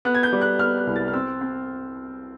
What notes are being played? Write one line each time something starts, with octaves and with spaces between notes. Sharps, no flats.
B3 F#6
G#6
G6
G3
F#6
B3 F6
F#6
C2
A6
F6
C4 E6
C4